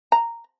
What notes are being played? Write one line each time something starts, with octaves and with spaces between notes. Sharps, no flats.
A#5